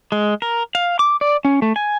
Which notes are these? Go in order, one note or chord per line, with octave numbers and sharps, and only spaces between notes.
G#3
A#4
F5
D6
D5
C#4
A3
G#5